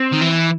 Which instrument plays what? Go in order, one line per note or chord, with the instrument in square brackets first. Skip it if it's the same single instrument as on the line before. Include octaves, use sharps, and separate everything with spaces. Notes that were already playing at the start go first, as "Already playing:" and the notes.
Already playing: [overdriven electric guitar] C4
[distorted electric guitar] D#3
E3